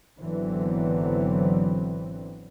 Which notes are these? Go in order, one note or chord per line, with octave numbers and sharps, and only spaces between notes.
G#1 D3 E3 F#3 B3 C4